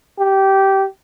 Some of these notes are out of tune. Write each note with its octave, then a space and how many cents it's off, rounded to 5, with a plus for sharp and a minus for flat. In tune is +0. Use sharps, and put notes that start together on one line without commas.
G4 -15